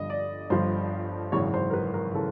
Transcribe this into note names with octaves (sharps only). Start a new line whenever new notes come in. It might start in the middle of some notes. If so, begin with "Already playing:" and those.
Already playing: G1 G2 D3 F3 D#5
D5
G1 G2 D3 F3 C5
G#1 F#2 C#3 E3 C#5
C5
A#4
B4
A#4
C#3 E3 A4